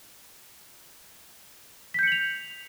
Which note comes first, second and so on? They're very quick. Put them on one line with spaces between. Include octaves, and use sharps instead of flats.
B6 G6 C#7 F#7 F7